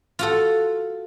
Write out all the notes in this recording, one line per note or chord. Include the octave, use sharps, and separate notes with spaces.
F4 F#4 A4